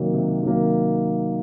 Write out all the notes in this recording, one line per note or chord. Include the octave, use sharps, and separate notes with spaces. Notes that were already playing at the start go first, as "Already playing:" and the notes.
Already playing: C3 D#3 F#3 A#3
C3
D#3 F#3 A#3